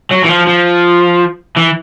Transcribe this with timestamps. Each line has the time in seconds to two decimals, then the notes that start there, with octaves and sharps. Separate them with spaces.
0.11 F#3
0.24 E3
0.29 F3
0.47 F3
1.56 E3